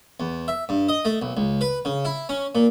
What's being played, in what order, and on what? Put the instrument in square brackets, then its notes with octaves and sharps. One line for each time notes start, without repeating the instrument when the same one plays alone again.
[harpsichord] E2
E5
G2
D#5
A3
B1
C#2
B4
C#3
E4
C#4
A#2